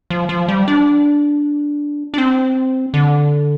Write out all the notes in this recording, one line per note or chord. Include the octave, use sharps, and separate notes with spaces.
F3
F3
G3
D4
D4
C4
D3